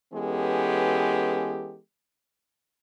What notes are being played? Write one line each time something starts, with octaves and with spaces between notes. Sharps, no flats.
E3 G#3 B3 C#4 G4 A4